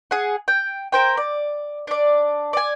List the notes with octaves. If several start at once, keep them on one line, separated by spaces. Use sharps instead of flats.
G#4 F#5
G5
A#4 C5 G5
D5
D4 D5
D5 G#5